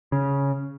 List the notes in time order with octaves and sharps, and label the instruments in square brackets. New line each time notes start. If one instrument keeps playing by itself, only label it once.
[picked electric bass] C#3